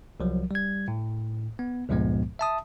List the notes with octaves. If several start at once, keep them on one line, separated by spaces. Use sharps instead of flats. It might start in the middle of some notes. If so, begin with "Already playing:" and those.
C2 F3 F#3
G3 G#6
A2
B3
C#2 G2 A#2 F3 G#3 B3
E5 A5 D#6